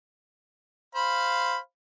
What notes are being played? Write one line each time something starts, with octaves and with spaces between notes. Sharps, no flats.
C5 F5 B5